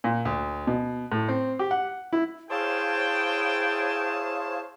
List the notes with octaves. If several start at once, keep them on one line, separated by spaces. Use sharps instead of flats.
A#2
D2
B2
A2
C4
G4
F#5
E4
E4 G#4 C5 C#5 F5 G5 A5